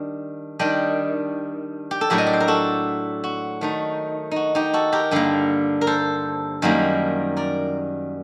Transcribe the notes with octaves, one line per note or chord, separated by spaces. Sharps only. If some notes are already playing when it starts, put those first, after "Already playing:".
Already playing: D#3 G3 D4 D5
D#3 G3 D4 D#5 G5
G4
A4
A2 F#3 A3 D4 G4 A#4
D#5
D5
C5
A#4
F#4 A4
F#4
D#3 A3 D#4
D#4 F#4
D#4 G4
F#4 A4
G4 A#4
G2 D3 G3 A#3
A#4
A4 C5
F#2 D#3 G3 A#3
A#4 D5